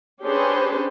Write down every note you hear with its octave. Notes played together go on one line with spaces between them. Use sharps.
C#4 D4 G4 G#4 B4 C5